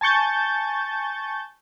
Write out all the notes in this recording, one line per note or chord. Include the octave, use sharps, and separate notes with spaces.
G#5 A5 C#6 G6 A6